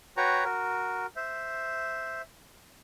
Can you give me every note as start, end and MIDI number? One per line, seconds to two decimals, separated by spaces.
0.17 0.44 66
0.17 0.44 71
0.17 0.44 73
0.17 0.44 79
0.17 0.44 82
0.17 0.44 85
0.44 1.06 66
0.44 1.06 70
1.16 2.22 72
1.16 2.22 76